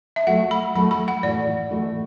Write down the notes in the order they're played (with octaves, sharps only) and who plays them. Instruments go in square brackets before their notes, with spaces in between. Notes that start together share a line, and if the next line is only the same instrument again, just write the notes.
[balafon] E5
[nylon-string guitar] F#3 A3 F#4 A4 [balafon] F#5
[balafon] B5
[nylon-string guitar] F#3 A3 F#4 A4 [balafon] B5
[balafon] B5
F#5
[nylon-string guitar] A2 E3 A3 F#4 [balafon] D5
[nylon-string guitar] A2 E3 A3 F#4